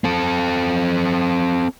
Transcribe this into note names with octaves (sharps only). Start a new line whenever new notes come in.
C4 A4